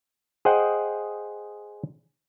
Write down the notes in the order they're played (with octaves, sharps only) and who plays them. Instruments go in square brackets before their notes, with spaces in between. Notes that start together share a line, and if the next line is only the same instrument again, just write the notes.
[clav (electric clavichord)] G#4 C5 D#5 F#5 G5